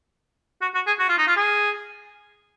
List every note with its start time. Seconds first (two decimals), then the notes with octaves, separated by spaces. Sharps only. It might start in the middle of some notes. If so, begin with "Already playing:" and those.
0.62 F#4
0.75 F#4
0.87 G#4
0.99 F#4
1.09 F4
1.18 D#4
1.27 F4
1.36 G#4